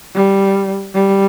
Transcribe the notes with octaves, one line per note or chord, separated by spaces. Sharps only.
G3
G3